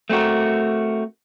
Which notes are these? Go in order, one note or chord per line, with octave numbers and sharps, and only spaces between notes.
A3 C4 D#4 F#4 A#4